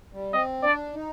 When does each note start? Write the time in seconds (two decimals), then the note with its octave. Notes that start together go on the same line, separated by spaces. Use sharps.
0.13 G3
0.33 C4 D#5
0.63 D4 D5
0.94 D#4